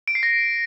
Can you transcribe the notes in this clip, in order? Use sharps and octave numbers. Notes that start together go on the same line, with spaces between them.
D7
C7
A#6